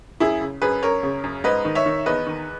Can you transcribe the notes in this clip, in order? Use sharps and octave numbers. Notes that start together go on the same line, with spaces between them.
F#2 E4 G#4
C#3
F#2 G#4 B4
F#2 A#4 C#5
C#3
F#2
G#2 B4 D#5
D#3
C#5 E5
D#3
E2 B4 D#5
D#3